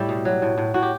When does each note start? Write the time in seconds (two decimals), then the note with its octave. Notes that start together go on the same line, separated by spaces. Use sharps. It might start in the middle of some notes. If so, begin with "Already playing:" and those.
Already playing: A2 G3 E4 G4
0.09 B2
0.25 F#3
0.42 A2
0.58 A2
0.74 A2 F#4
0.83 G4